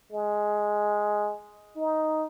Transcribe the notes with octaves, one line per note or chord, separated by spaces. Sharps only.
G#3
D#4